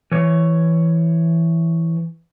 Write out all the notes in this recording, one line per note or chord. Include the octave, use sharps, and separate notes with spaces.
E3 C#5